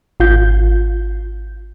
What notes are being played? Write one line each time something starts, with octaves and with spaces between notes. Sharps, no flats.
G#1 F4 G6